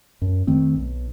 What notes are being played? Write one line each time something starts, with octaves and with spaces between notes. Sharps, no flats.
F#2
F2 D#3 A3 C4
B1